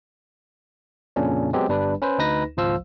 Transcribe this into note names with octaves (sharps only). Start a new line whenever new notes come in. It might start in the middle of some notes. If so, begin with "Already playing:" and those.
F2 A#2 C#3 C#4 D4
F#3 G#3 B3 C4 G4
G1 G3 D4 B4
C#4 B4 C5
D2 D#4 B4 A#6
G#1 C#2 F3 C5 F5 E6